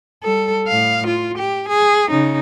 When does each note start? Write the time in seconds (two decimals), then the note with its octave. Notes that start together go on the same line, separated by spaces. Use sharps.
0.23 G3 A4
0.68 A2 F5
1.07 F4
1.38 G4
1.68 G#4
2.10 C#3 D#4